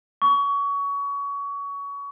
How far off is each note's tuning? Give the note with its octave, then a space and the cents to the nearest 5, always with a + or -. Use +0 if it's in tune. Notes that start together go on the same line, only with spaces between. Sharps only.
C#6 +25